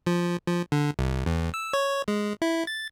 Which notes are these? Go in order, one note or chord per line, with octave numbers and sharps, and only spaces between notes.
F3
F3
D3
C2
E2
E6
C#5
G#3
E4
A6